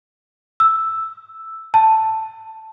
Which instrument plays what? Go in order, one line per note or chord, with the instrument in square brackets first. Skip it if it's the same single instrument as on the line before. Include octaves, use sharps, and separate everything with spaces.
[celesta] E6
A5